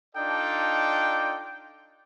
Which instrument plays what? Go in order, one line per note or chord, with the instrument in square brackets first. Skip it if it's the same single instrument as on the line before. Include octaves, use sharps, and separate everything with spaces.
[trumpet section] D4 D#4 F4 A4 D5 G5